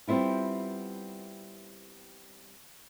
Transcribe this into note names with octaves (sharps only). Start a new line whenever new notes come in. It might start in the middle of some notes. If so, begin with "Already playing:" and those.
G3 B3 C4 E4 F4